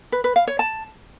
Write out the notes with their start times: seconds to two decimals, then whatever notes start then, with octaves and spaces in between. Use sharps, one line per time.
0.12 B4
0.24 B4
0.36 F5
0.47 C#5
0.59 A5